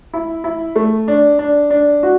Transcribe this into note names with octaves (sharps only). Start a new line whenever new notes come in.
E4
E4
A3
D4
D4
D4
F#4